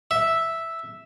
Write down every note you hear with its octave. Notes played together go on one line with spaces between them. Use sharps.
E5